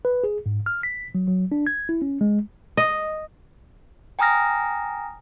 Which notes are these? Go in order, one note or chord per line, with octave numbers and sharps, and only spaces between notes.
B4
G#4
G#2
F6
B6
F#3
F#3
D4
G#6
E4
C#4
G#3
D#5
G5 G#5 A#5 D#6 F6 A#6